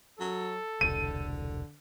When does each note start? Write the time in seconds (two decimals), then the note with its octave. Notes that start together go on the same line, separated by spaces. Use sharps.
0.20 F#3 A4
0.81 E1 C2 D3 D#7